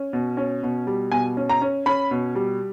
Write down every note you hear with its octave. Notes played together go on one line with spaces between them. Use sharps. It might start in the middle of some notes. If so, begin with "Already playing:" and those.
Already playing: C#4
B2
C#4
B2
G3
B2 G#5
C#4
A#5
C#4
C#4 B5
B2
G3